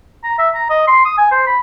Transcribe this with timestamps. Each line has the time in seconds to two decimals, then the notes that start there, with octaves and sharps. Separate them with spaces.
0.24 A#5
0.38 E5
0.54 A#5
0.70 D#5
0.87 C6
1.05 D#6
1.18 G#5
1.31 C5
1.47 B5